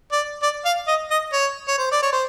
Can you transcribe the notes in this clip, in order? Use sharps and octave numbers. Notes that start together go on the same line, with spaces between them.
D5
D5
F5
D#5
D#5
C#5
C#5
C5
D5
C#5
C5